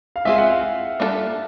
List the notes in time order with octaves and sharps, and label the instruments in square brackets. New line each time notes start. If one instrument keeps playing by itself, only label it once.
[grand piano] F5
[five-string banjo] G#3 C4 F4 G#4 [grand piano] E5
[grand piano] F#5
F5
[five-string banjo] G3 A#3 D4 F4 A4